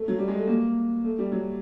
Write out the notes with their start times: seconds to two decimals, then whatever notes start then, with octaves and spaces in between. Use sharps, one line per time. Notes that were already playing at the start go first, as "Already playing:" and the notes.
Already playing: A3
0.08 F#3
0.18 G3
0.28 G#3
0.38 A3
0.47 A#3
1.04 A3
1.19 G3
1.32 F#3